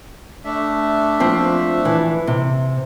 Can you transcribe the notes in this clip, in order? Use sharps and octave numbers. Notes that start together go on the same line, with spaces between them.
A3 D4 E5
F3 C4
E3
C3